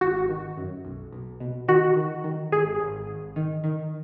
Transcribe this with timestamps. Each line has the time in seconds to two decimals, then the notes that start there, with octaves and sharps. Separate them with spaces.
0.01 G#1 F#4
0.29 D#3
0.57 F#2
0.85 B1
1.13 B1
1.40 B2
1.68 D#3 F#4
1.96 D#3
2.24 D#3
2.52 G#1 G#4
2.80 G#1
3.07 G#1
3.36 D#3
3.64 D#3